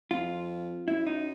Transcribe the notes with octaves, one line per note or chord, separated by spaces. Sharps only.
F2 F4
F#2 E4
D#4